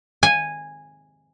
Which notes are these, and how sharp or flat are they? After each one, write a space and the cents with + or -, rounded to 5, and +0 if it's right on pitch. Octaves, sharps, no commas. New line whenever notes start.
G#5 -10